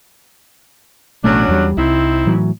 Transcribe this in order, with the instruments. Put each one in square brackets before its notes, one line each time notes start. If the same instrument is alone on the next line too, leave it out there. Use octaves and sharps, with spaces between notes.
[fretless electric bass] A1 B2 A3 [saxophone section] F#3 C#4 D4
[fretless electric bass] E2 G3
[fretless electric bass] C2 [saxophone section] C4 D#4 E4
[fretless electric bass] A2 E3 F#3